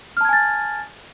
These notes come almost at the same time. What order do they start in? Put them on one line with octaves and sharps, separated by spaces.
F6 A5 G#6 G#5 A6